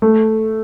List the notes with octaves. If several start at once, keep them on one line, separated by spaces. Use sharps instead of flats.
A3